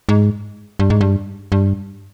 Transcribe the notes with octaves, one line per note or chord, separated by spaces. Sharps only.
G#2
G2
G#2
G2
G2